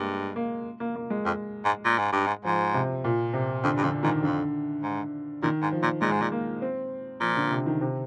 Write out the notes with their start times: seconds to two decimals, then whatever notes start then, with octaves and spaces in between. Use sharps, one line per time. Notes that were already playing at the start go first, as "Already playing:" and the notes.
Already playing: G2 G#3 A#3
0.36 A#3
0.80 A#3
0.95 A#3
1.10 G#3
1.25 F2
1.65 G#2
1.85 A#2
1.99 G#2
2.12 G2
2.27 G#2
2.45 G#2 F3
2.74 C3
3.04 A#2
3.33 C3
3.64 F2 D3
3.77 G2
3.84 F2 D3
4.03 G#2 D#3
4.23 F2 D3
4.83 G#2
5.43 A#2 D#3
5.62 G#2
5.72 F3
5.82 A#2
6.02 A#2 G#3
6.12 G#2
6.22 A#2
6.32 A#3
6.62 C4
7.21 A#2 F3
7.36 D3
7.51 C3
7.66 D#3
7.81 C3